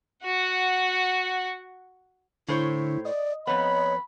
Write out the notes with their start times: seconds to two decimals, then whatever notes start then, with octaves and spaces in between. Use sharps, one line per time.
0.24 F#4 F#5
2.48 A2 D3 E4 C5 C#5
3.05 D5 D#5
3.47 F2 B3 C#5 B5